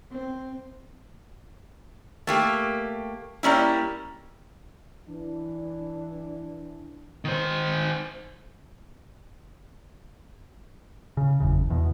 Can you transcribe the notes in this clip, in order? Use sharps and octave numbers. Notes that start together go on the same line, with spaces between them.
C4
A3 A#3 G4
G3 A#3 C#4 E4
E3 D4
D#3 C5
C#3
F#1 E2 C#3
E2 B2